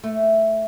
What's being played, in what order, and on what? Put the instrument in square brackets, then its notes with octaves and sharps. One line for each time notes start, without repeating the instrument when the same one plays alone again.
[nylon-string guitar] A3